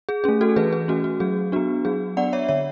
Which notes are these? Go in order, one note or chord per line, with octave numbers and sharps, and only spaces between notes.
G#4
A3 C#4 G#4
F#4 A4
E3 G#4 B4
G#4
A3 C#4 F#4
F#4
F#3 G#4
B3 D4 F#4
F#3 G#4
B3 D4 D5 F#5
C#5 E5
D3 C#5 E5